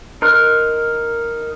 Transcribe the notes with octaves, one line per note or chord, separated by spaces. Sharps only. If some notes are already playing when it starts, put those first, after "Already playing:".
D#4 A#4 C6 F6 F#6